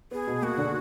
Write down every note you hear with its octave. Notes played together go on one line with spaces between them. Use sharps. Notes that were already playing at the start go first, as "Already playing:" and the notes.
B3 G#4
B2
A#3 F#4
D3